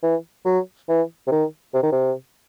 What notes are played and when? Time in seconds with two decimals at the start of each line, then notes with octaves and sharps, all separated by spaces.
0.03 E3
0.46 F#3
0.89 E3
1.27 C3
1.31 D#3
1.74 C3
1.83 D#3
1.92 C3